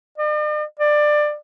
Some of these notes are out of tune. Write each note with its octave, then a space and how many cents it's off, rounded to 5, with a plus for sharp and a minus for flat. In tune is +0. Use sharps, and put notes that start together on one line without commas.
D5 +45
D5 +20